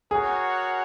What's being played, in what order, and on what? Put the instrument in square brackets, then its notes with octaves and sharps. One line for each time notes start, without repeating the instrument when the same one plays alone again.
[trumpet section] F#4 A#4 C#5 F#5 [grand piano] G#4